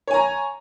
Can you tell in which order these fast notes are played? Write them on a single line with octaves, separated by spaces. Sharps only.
C#5 G#5 A#5